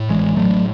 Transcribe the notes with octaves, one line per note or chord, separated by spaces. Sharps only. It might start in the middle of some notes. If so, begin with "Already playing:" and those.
Already playing: A2
A1 E3 G#3
A2 F#3 A3